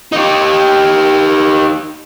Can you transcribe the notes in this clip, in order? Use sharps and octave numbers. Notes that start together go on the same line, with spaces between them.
D#4 G4